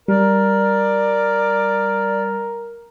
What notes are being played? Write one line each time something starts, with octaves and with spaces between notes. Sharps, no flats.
G3 A#4 D5